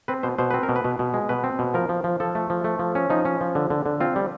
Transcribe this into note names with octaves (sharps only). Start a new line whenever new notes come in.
C4 B4
B2 C5
B2 C5
C4 B4
A#4
B2
B4
B2
B2
G#3
B2 B4
C4
B2
F3 A#4
F3
F3
F3 A4
A3
F3
A3
F3
C#4
F3 D#4
C#4
F3
D3
D3
D3
C4 F4
G3